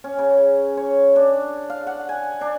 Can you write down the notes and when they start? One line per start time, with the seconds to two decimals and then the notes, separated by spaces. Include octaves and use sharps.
0.04 C#4
0.19 C#3
0.77 C#5
1.16 D4
1.70 F5
1.87 F#5
2.09 G#5
2.41 D4